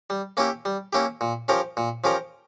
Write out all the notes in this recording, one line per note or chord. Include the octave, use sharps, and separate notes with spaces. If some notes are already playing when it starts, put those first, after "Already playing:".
G3
A#3 C#4 E4 G4
G3
A#3 C#4 E4 G4
A#2
F3 C#4 G4 A#4
A#2
F3 C#4 G4 A#4